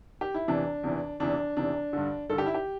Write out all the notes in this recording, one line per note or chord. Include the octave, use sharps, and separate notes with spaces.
G4
E4
E2 C3 E3 D4
E2 C3 E3
E2 C3 E3 D4
E2 C3 E3 D4
G2 D3
G2 D3 A4
G4
E4
G4